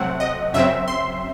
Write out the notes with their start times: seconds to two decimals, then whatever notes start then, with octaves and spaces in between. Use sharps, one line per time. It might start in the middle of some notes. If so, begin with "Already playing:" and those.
Already playing: C3 F#3 A3 C4 F#5
0.20 D#5
0.53 F#2 C#3 F#3 C4 E5
0.88 C6